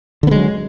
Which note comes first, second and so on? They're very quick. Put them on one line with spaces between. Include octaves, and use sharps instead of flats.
D3 B3 G#3 F#3